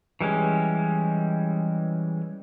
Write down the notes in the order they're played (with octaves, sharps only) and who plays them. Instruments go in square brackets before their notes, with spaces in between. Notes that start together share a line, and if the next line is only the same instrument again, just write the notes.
[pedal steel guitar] E3 G3 G#3 C#4